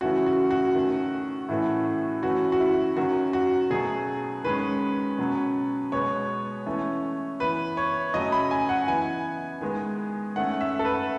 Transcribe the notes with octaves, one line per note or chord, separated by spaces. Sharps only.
C#3 E3 A3 C#4 F#4
F#4
F#4
D#3 A3 C#4
A2 E3 A3 C#4
E3 A3 C#4 F#4
F#4
E4
D#3 F#3 C#4 F#4
F#4
B2 F#3 A3 C#4 G#4
D#3 G#3 C#4 B4
B2 F#3 C#4
B2 G#3 B3 C#5
E3 A3 C#4
E3 B3 B4
C#5
C#3 F#3 A3 C#4 D#5
B5
G#5
F#5
E3 B3 G#5
D#3 G#3 B3
D#3 A3 C#4 F#5
E5
A4
B4